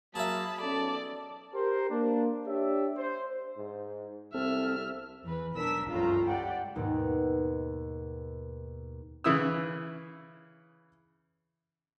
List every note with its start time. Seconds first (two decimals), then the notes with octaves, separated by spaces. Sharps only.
0.15 F#3 A#3 G#4 E5 A5 B5
0.61 B1 C#4 A4 D5 A5
1.54 G4 A#4 C5
1.90 A#3 D4
2.47 D4 G4 C#5 D5 E5
2.97 C5
3.57 G#2
4.34 C2 C4 A4 E5 F6
5.23 E2 E3 B4
5.54 B1 E3 D4 A#4 E6 B6
5.91 G1 C#2 F#2 A2 F4 A#5
6.29 G4 D5 F#5 G5
6.75 D#2 G#2 B2 D#4
9.24 C#3 E3 E4 D#6 E6